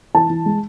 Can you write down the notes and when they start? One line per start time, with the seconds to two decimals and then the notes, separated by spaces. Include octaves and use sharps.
0.14 E3 A5
0.30 E3
0.46 G#3